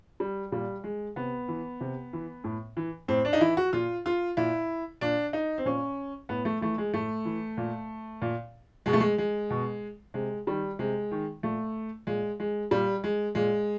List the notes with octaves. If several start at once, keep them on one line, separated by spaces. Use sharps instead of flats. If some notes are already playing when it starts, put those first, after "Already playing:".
G3
A#2 G3
G#3
C3 B3
E3
C3
E3
A2
E3
A2 C4
D4
D#4
E3 E4
F#4
A#2 F4
F4
A#2 E4
A#2 D4
D#4
C4
A#2 C#4
A2 B3
A3
E3 A3
G#3
A2 A3
E3
A#2
A#2
B2 G#3
A3
G#3
G#3
B2
C3 G#3
D#3 G3
C3 G#3
D#3
A#2 A3
A#2 G#3
G#3
A#2 G3
G#3
A#2 G#3